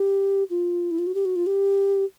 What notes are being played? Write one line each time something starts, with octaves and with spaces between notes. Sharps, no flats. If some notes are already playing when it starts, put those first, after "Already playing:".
Already playing: G4
F4
E4
F4
F#4
G4
F#4
F4
G4